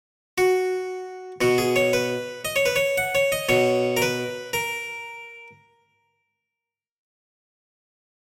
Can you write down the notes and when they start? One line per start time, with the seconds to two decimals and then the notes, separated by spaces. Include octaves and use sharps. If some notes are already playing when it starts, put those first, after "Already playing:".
0.38 F#4
1.41 B2 F#4
1.58 G#4
1.76 C#5
1.93 B4
2.45 D#5
2.56 C#5
2.66 B4
2.76 C#5
2.98 F#5
3.15 C#5
3.32 D#5
3.49 B2 C#5
3.97 A#4
4.02 B4
4.53 A#4